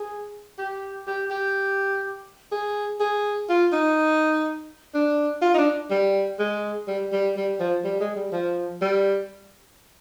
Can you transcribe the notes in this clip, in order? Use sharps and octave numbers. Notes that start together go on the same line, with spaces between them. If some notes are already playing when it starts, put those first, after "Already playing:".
Already playing: G#4
G4
G4
G4
G#4
G#4
F4
D#4
D4
F4
D#4
D4
G3
G#3
G3
G3
G3
F3
G3
G#3
G3
F3
G3